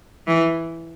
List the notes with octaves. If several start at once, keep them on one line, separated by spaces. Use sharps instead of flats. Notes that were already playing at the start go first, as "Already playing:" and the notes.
E3